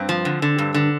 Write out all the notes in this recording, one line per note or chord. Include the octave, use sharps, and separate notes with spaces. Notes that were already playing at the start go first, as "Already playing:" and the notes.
Already playing: G2 C4
F3
D3
D3
G2
D3